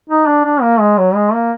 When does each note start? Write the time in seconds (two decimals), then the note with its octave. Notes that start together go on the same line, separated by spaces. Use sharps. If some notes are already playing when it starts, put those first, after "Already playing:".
0.10 D#4
0.27 D4
0.45 D4
0.62 A#3
0.80 G#3
0.98 F#3
1.15 G#3
1.33 A#3